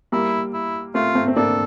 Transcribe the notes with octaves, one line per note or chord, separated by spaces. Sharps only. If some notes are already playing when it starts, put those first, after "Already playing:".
G3 A#3 E4
E4
A3 C4 F4
A3 C4
C4
A#3 D4 A4